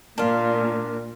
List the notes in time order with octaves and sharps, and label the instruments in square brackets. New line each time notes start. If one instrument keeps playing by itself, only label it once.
[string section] A#2 [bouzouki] D4 F4 [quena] A#4